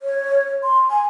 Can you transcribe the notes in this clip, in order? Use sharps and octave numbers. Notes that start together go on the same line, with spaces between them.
C#5
C6
G#5